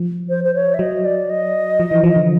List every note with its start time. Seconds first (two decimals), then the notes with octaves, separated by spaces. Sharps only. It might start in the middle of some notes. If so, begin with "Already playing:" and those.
Already playing: F3
0.29 C5
0.43 C5
0.54 C#5
0.74 E5
0.79 F#3 D#5
1.05 D5
1.29 D#5
1.80 F3
1.91 E3
2.04 F3
2.16 D3